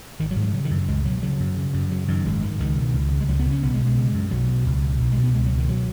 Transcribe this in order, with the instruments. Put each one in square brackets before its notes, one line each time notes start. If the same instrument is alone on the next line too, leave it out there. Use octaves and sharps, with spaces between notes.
[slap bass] G#1 D#3
F#3
G#2
F#3
C#3 F#3
D#3
F#2
C#2 G#3
B2 F#3
C#3 F#3
F#2
C#3
F#2
C#3 F#3
F#2 D#3
G#1 G#3
G#2 D#3
C#2 D#3
B2
C#2
C#3
G#3
C#2 F#3
B3
C#3
C#4
B1 B3
G#3
B2
G#3
C#3
F#2
B1 F#3
B2
C#2
B2
B1
G#3
B2
B3
C#2 G#3
F#3
B2
D#3
F#3